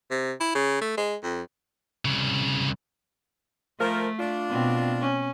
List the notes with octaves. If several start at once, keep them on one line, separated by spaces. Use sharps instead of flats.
C3
E4
C#3
A3
G#3
F2
C2 C#3
F3 A3 A#4
D4 F4
B2 C4
C#4